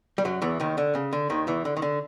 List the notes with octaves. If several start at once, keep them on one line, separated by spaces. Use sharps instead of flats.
G3
F#2 F#3
E2 E3
D#2 D#3
D3
C#3
D3
D#2 D#3
E2 E3
D3
D#3
D3